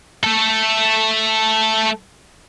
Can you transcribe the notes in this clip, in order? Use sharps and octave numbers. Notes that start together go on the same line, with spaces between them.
A3 A4